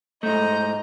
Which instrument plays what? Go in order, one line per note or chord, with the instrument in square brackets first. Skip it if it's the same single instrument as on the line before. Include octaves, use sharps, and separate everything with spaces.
[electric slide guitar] G#2 A3 [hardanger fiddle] D#5 A#5 [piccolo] G6